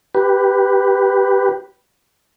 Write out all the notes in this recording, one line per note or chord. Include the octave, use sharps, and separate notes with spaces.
G4 B4